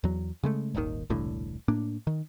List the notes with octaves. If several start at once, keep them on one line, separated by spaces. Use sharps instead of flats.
E2 F#3
C#3 G#3 A3
D#1 G#1 D#2 D#3
E1 C2 A2 D3
A2 A#3 D4
D#3